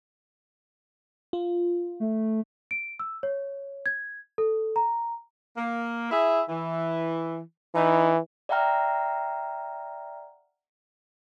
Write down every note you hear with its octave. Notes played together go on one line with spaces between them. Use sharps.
F4
A3
D7
E6
C#5
G#6
A4
A#5
A#3
E4 G#4 E5
E3
E3 D#4 E4
D5 E5 F#5 G5 A#5 F6